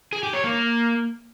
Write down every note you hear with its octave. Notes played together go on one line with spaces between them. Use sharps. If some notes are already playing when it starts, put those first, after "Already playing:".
G#4
G4
C#5
A#3